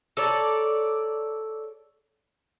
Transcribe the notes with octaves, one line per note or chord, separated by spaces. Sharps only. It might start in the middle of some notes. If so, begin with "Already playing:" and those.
A4 C#5 D5 A#5